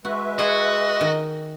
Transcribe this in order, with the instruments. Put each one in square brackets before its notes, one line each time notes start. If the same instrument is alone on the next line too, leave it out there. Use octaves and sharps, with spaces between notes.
[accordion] G#3 B4 E5 [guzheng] F#4
[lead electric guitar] F#4 [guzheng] G#4 C#5 F#5 [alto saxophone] D#5
[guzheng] D#3